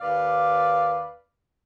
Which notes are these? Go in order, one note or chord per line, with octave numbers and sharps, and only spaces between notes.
D#2 B4 D5 F5